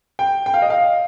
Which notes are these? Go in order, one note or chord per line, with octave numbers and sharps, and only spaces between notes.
G5
G5
F5
D#5
F5